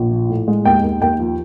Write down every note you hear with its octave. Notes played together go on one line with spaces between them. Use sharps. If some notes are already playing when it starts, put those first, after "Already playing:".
Already playing: A#1
F3
A2
G#3
D#2 G5
D#2
D#2 G5
F3